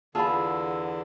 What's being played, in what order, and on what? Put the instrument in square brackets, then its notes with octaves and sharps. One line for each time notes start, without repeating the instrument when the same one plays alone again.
[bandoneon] E2 D3 [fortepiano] F4 G#4 [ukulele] A5 B5 [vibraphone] E6